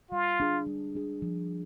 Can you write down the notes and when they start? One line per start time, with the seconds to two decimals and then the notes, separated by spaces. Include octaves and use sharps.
0.11 G3 F4
0.40 D4 G#4
0.67 G3
0.95 D4 G#4
1.22 F3